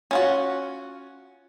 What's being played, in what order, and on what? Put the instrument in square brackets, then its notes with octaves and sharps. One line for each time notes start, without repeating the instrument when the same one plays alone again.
[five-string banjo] C#4 F4 F#4